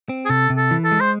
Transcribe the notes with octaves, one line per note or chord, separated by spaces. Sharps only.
C4
G#4
C3 A4
C3
A4
E3
A4
G#3
C5